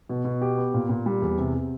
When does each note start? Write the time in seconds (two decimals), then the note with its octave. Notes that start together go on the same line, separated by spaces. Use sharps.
0.09 B2
0.25 B2
0.42 G4
0.57 B3
0.74 A#2
0.89 A#2
1.06 G3
1.22 E2
1.38 C3
1.54 C3